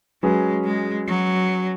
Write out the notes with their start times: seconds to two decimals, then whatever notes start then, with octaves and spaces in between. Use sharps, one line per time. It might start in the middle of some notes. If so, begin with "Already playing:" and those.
0.23 F#3 G#3 C#4 G#4 B4
0.65 G#3
1.07 F#3